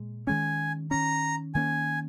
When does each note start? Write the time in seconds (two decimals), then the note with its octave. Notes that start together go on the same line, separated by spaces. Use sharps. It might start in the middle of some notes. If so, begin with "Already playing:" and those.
Already playing: A#2 G#3
0.27 D#3 G#3 C#4 G#5
0.91 D#3 C#4 A#5
1.55 D#3 A#3 C#4 G#5